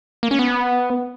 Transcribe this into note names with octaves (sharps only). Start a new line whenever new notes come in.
A#3
C#4
B3